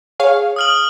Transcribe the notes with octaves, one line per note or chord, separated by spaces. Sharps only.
G#4 C#5 F5
D#6 F6 F#7